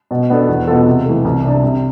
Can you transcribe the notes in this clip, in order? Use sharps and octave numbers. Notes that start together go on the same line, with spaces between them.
B2
B3 D4 A4
E2
B2 B3 F4 A4
C3
E3 A3
C2
C3 G3 D4
C3